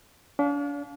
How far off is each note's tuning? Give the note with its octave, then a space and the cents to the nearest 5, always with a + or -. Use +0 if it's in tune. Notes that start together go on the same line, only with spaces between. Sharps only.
D4 -40 F5 +15